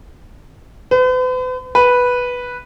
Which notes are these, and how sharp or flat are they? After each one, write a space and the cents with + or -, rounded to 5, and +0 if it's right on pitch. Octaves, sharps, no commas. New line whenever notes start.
B4 +45
B4 -5